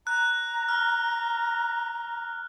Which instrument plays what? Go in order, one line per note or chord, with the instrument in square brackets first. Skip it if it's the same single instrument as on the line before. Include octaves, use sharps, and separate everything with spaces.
[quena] A#5 [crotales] F#6
[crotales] F6